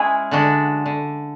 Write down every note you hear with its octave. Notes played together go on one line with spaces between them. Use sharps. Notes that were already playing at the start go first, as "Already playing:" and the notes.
Already playing: G#3 C#4 E4 G#4
D3 G#3 D4 F#4
D3